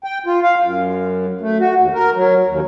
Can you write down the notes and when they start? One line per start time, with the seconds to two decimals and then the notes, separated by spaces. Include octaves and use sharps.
0.04 G5
0.26 F4
0.43 F5
0.61 F#2
1.41 A3
1.60 F#4
1.79 D#2
1.94 A#4
2.15 F#3
2.47 D#2